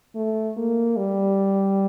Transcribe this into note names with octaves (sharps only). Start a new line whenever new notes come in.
A3
A#3
G3